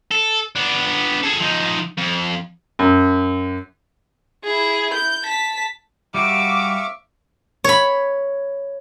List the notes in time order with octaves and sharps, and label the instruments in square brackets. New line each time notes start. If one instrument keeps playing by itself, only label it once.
[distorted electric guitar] A4
B3 D4
G#4 A4
F3 D#4
F2
[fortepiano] F#2
[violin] E4 G#4
G6
A5 B6
[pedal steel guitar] G3 F#4 G4 [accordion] E5 F5 C#6 [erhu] D6
[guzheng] C#5 B5